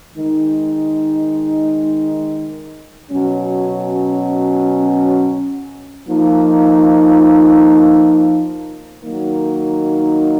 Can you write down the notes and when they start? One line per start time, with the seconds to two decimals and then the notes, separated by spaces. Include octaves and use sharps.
0.15 D#3 G#3 D#4
3.11 B2 F#3 C#4
6.08 F3 A#3 D#4
9.04 D#3 F#3 A#3 D#4